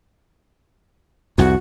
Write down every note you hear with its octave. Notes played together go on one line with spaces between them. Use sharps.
C2 F2 F#4